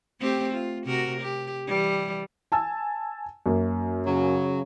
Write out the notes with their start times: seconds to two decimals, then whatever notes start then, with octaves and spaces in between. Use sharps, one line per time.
0.20 A3 C4 G4
0.53 F4
0.85 C3 F#4 A#4
1.21 G4
1.67 E3 G3
2.52 G#5 A5 E6
3.46 F#2 A#3
4.07 C#3 F#3